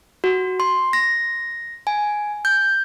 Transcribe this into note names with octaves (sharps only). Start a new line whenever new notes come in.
F#4
C6
A#6
G#5
G6